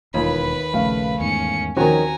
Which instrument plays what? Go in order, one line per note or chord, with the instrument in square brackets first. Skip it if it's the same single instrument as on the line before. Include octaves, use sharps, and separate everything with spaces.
[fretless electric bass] E1 E3 A#3 [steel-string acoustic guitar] D#2 [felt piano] F4 [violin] B4 B5
[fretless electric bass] A#1 C#3 [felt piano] A3 F5
[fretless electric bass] E2 G#2 [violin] C#4 C#7
[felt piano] D#2 C4 F#4 [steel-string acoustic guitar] D#3 C#4 [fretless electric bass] F3 [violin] G#5 A#5